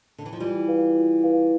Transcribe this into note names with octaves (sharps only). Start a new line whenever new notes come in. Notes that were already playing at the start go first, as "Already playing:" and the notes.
D3
E3
F3
E3 G3 F4
B4 F5
F4
B4 F5